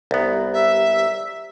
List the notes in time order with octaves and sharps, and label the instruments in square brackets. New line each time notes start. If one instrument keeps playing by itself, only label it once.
[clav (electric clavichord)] C2 B3 [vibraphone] G4 B4 A#5
[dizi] E5